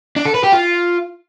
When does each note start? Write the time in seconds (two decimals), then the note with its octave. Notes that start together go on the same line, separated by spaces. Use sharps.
0.16 D4
0.25 A4
0.35 B4
0.44 G4
0.53 F4